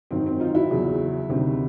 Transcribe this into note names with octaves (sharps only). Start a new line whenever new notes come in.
G#1 F#2 D#3 F#3 C4
C4
D#4 F4
E4 F#4
E2 C#3 F#3
D2 C3 D#3